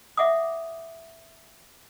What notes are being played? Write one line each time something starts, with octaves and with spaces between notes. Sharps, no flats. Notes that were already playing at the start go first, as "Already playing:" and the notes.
E5 F#5 D6 D#6